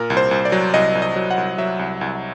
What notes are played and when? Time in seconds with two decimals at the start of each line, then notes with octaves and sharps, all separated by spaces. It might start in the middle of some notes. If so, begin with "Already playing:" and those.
Already playing: A#2 A#4
0.10 C2
0.17 C5
0.31 C2
0.45 D5
0.52 F#3
0.74 C2 D#5
0.95 C2
1.02 D#5
1.16 F#3
1.31 F#5
1.38 C2
1.58 F#3 E5
1.79 C2
2.01 C2